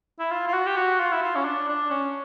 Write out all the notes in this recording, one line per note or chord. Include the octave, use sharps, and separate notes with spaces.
E4
F4
F4
F#4
G4
F#4
F4
E4
F4
C#4
D4
D4
C#4